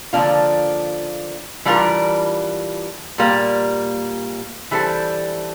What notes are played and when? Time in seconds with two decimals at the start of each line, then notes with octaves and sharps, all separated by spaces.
0.13 D3 F3 A#3 D4 F4
1.65 E3 G3 D4 F4 A#4
3.18 A#2 G3 A#3
4.71 E3 G3 D4 A4 C5